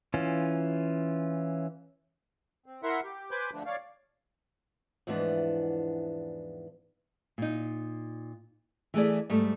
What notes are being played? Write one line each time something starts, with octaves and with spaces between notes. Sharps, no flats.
E3 C#4 F4
C4
E4 A#4 E5 F#5 C6
G4
B4 C5 G#5 B5 D6 G6
D3 F3 A3 D4
C#5 D5 F5
E2 G#2 E3 F3 B3 D4
A#2 D#4
E3 A3 G#4 D5
G#2 G3 A3